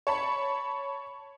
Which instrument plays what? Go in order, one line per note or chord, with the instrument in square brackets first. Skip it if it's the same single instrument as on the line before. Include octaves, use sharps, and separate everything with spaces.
[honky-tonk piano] C#5 A5 B5